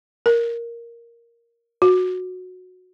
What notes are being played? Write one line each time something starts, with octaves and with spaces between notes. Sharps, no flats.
A#4
F#4